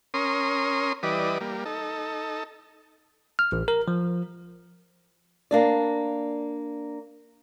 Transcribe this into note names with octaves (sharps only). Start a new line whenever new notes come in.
C#4 A#4 C6 D#6
E3 G3 B4 D5 D#5
G3 A#3
D#4 A4
F6
A1
A#4
F3
A#3 D4 D5